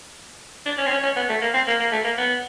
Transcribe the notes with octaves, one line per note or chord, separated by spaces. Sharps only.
D4
C#4
C4
C#4
C#4
B3
A3
A#3
C4
A#3
A#3
A3
A#3
B3